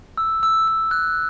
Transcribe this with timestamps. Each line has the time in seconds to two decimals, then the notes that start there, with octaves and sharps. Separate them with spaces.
0.18 E6
0.43 E6
0.68 E6
0.91 F#6